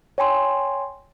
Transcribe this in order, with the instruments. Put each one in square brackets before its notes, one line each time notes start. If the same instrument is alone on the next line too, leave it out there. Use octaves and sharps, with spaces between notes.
[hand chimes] C#5 G5 G#5 C6